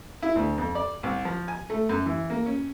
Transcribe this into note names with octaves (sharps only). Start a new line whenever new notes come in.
E4
D2
F2
D5
C2
F3
G#5
A3
F#2
E3
A#3
C#4